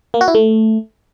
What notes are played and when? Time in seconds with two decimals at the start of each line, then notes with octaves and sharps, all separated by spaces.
0.14 A#3
0.21 F#4
0.28 E4
0.35 A3